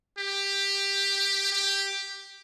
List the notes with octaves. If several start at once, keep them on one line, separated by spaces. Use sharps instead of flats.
G4
G4